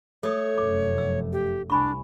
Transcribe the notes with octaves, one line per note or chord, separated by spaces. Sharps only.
A3 A4 C#5 D#6
F1 F#2 D6
E6
G4
C2 D4 G#5 B5 C#6